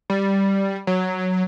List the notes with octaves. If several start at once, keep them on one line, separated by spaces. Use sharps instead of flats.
G3
F#3